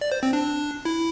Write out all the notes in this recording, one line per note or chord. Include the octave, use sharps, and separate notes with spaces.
D5
C5
C4
D4
E4